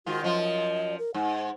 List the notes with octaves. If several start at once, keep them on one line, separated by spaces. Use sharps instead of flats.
G#2 D#3 F4 F#4
F#2 F3 F4 D#5
A#4
G#2 F#5